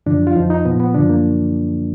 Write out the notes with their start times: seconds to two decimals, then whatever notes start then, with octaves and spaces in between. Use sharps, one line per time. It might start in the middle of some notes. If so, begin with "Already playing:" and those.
0.06 F#2 D3 F3 D4
0.27 F4
0.35 F2 F3 D#4
0.50 D#4
0.65 A#2 F3 B3
0.80 B3
0.95 F#2 D3 F3 D4
1.09 A#3